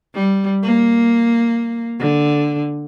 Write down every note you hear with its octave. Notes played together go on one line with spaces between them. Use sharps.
G3
A#3
D3